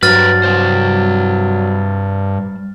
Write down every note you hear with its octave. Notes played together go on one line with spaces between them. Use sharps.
G2 F#3 B4 C5 A#5 F6 A6
G3 C5